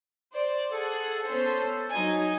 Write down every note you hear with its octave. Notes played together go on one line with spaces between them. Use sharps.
C5 D5
G#4 A4 F#5
B3 C#4 C5
F#3 D#4 G#5